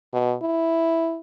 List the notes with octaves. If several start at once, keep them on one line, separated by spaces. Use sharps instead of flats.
B2
E4